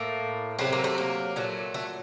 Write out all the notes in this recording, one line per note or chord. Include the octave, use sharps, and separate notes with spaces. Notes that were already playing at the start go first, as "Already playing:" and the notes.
Already playing: A2 A3 A#3
C3 F#3 A3 C4
A#3
A3
A#3
A#2 F#3 A3
A3